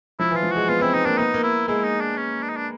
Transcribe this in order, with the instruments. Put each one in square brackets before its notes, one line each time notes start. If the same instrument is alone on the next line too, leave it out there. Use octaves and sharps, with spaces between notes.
[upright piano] F3 [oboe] E4
[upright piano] E3
[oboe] F4
[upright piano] F3
[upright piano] G#3 [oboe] F#4
[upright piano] B3 [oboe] F4
[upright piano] C4 [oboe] E4
[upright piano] B3 [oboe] D#4
[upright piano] A#3 [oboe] D4
[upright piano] B3 [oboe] D#4
[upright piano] A#3
[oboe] E4
[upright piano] G#3 [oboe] E4
[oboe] D#4
D4
C#4
D4
D#4
D4